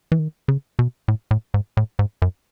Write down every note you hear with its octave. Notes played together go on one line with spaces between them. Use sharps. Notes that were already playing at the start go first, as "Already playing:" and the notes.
E3
D#3
C#3
B2
A2
A2
G#2
A2
G#2
F#2